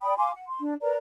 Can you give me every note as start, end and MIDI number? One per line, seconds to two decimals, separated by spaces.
0.02 0.17 74
0.02 0.17 79
0.02 0.17 83
0.02 0.17 87
0.17 0.31 77
0.17 0.31 80
0.17 0.31 84
0.17 0.31 86
0.34 0.45 78
0.47 0.60 84
0.60 0.74 62
0.81 0.96 70
0.81 0.96 71
0.81 0.96 74
0.81 0.96 82